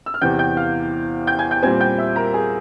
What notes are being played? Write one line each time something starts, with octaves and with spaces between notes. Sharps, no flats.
E6
F6
E2 C3 E3 G5 G6
G5 G6
F5 F6
G5 G6
G#5 G#6
G5 G6
A#2 G3 C4 G#5 G#6
G5 G6
E5 E6
A#4 A#5
G#4 G#5